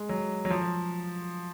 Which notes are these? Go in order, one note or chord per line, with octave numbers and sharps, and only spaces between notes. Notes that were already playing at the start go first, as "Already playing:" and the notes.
Already playing: G#3
F#3
F#3
F3